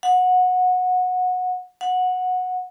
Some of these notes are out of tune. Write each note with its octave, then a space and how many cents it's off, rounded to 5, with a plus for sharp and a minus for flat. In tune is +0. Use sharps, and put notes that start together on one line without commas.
F#5 -20
F#5 -15